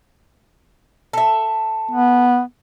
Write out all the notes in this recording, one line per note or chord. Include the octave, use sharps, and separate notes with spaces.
A4 E5
B3